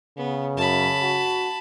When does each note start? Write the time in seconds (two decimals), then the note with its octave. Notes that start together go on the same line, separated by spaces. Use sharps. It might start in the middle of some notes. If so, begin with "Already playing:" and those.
0.17 C#3 B3
0.57 F#2 A5 B5
1.02 F#4